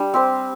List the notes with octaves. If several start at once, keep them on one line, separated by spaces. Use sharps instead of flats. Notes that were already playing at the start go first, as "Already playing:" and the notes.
Already playing: G3 D4
C4 G4 C5